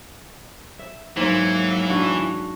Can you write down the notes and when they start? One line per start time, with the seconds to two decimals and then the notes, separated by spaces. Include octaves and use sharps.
0.79 E5
1.17 G#2 E3 F#3 A#3
1.88 D4 F#4